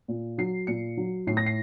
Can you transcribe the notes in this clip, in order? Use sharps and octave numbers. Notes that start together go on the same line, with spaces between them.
A#2
F#3 C7
A#2 C#7
F#3
A2 C7
A#6
C7